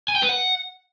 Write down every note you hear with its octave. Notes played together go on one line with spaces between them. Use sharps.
G#5
G5
B4
F#5